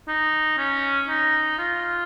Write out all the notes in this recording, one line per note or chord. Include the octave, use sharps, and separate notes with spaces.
D#4
C#4
D#4
F4